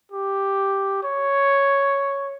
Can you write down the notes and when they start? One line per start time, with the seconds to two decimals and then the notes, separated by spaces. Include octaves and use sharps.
0.12 G4
1.03 C#5